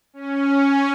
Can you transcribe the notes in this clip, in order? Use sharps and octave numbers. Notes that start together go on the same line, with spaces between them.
C#4